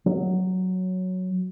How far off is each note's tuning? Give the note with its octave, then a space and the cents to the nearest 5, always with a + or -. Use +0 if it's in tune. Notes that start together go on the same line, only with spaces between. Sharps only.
F#3 +0